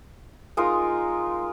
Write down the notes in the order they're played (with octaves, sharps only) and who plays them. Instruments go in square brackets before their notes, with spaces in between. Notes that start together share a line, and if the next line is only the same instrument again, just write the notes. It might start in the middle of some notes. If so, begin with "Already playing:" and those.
[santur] G#3 D#4 F4 A#4